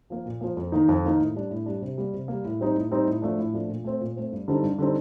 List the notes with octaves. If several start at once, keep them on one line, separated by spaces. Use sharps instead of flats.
F3 A#3
A#2
F3 A#3
F2
D#3 A#3 D#4
F2
D#3 A#3 D#4
A2
G3 D4
A2
G3 D4
C3
G3 A#3
C3
G3 A#3
A2
G3 C4 D#4
A2
G3 C4 D#4
A2
F3 A3 D4
A2
F3 A3 D4
A#2
A3 C4
A#2
A3 C4
G2
D3 G3 C4 D#4
G2
D3 G3 C4 D#4